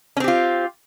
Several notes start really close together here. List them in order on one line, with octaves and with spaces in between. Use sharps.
C#4 C4 G4 F4